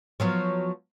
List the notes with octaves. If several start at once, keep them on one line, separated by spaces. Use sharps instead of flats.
F3 F#3 B3